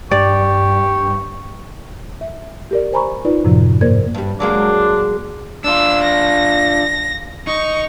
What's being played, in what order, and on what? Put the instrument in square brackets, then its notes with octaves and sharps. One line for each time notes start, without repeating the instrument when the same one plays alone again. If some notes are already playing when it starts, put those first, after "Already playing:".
[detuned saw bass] G2 [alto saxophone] G4 [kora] D5 [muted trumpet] C#6
[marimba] E5
G4 A#4 D5
C5 G#5 A#5 B5 C#6
D#4 F4 B4 D5
F#2 A2 C3 F3
G#2 A#3 A#4 C5 D5 G#6
[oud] G2 G3
[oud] F#3 G#3 A#3 [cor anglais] D4
[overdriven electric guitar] D4 F4 [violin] E6
[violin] A#6
[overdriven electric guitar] D#4 [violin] C#6